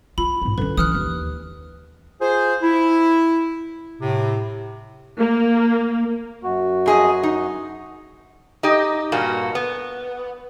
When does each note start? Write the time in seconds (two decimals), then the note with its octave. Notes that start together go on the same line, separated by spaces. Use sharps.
0.18 F4 B5
0.42 G#2 B3
0.58 D3 C#4 B4
0.78 E3 D#6 F6 F#6
0.94 D#2
2.21 F4 G#4 C5
2.62 E4
4.01 A2 C3
5.18 A#3
6.43 F#2 F#4
6.86 F2 G#4 D#5
7.23 D#4
8.63 D#4 G4 D#5
9.12 G2 A#2 A#3 F#4
9.55 B3